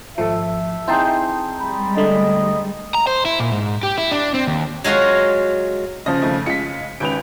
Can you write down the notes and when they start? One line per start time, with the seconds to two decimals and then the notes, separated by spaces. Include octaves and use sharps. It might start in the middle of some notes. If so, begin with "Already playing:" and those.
0.18 G#1 F3 A3 A4 E5
0.88 C4 D#4 E4 G#4 A5 C6
1.61 G3 G#3 B5
1.97 D3 A3 D#5 B5
2.95 A#5
3.07 C5
3.25 E4
3.40 A#2
3.52 G#2
3.83 G4
3.98 E4
4.12 D4
4.34 C4
4.47 D#2
4.84 F#3 G#3 F4 F#4 F5
6.06 C#3 F3 D#5
6.22 F2 D#3 A3
6.46 C#3 G#3 F4 B6 C#7
7.00 G#1 C#4 B4 G6 D7 F7